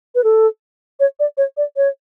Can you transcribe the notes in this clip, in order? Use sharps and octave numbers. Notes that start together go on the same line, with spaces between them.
B4
A4
C#5
D5
C#5
D5
C#5